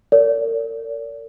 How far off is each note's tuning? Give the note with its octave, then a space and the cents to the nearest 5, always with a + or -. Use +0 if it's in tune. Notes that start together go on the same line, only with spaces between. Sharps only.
A#4 -35 D5 -40